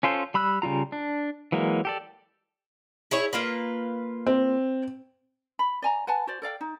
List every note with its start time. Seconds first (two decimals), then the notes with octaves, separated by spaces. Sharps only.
0.03 C#4 F4 A4 C5
0.34 G3 B5 E6 F#6
0.62 C#3 G3 F4 A#5
0.92 D4
1.52 E3 F#3 G#3 A#3
1.85 G4 A4 D5
3.11 E4 G#4 C#5
3.33 A#3 F4 B4
4.27 C4
5.59 B5
5.82 D5 G#5 A#5
6.07 B4 F#5 G#5 A5
6.27 F#4 C5 D5
6.42 A4 D5 F5 G5
6.61 D#4